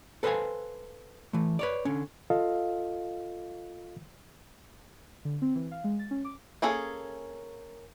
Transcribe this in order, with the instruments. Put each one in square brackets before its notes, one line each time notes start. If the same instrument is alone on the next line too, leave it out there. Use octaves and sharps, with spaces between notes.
[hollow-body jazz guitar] A4 B4 C5 D#5 F5 G#5
E3 A3
B4 C#5 D5
D3 C#4
[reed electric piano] F4 A4 D#5 F5
[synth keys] D3
C4
E3
F5
G#3
A6
C#4
D6
[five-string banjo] A#3 C#4 G#4 A4